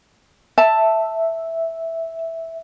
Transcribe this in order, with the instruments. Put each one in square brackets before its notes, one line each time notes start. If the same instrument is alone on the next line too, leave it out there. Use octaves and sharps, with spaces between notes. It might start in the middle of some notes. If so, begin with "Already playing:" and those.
[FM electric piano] E5 [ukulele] A5